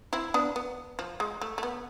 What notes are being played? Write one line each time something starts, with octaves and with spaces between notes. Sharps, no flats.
C4 E4
B3 D4
B3
F3
G#3
A3
A3
B3